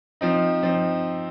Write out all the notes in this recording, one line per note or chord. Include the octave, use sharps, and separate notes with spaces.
F3 C4 D#4
F3 C4 D#4